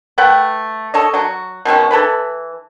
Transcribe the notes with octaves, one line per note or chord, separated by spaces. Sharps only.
A3 B4 F#5 G5
A4 C#5 D#5
F#3 F#4
B2 D#3 G#3 C#4
E3 A4 B4 B5